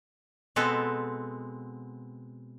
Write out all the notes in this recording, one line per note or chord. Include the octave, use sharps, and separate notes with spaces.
B2 G#3 B3 C4 A4